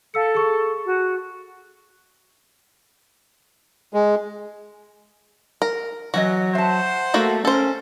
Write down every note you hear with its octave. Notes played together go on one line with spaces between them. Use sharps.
A4 F5 E6 C#7
G#4 C#6
F#4
G#3
A#4
E3 F#3 F#4 C#5 D#5
C5 E5 F#5 A5
A3 A#3 F#4 A4
C#4 A4 A#4 C5